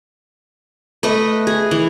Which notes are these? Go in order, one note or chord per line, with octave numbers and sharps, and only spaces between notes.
A3 B4 D#5
G#4
E3